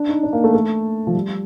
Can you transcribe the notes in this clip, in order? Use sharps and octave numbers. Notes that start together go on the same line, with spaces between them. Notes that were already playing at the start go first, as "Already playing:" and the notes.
Already playing: D4
D#4
D4
A#3
A3
A3
F3
G3